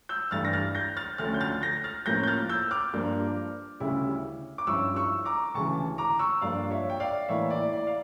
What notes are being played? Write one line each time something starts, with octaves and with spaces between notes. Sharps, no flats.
E6 G6
G2 E3 A3 D4 F6 A6
A#6
F6 A6
G6 A#6
F6 A6
D2 D3 F3 A3 C#4 F6 A6
G6
F6 A6
G6 A#6
F6 A6
A2 F3 A#3 C#4 G6 A#6
G6
F6 A6
E6 G6
D6 F6
G2 F3 A#3 D4
D2 C#3 G3 C#4 E4
D6
G2 F3 C#4 E4 C#6 E6
C#6 E6
A#5 D6
D2 C#3 E3 A5 C#6
A#5 D6
C#6 E6
G2 F3 A#3 D4 D5 F5
C#5 E5
G5
D5 F5
A2 E3 A#3 E4 C#5 E5
D5
D5
F5